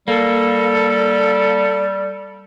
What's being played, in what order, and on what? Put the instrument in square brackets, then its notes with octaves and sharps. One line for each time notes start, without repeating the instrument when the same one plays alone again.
[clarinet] G3 [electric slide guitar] A#3 [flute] A4